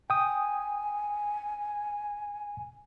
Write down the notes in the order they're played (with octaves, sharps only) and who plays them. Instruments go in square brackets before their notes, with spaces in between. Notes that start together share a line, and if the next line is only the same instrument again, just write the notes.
[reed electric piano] G5 D#6 [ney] G#5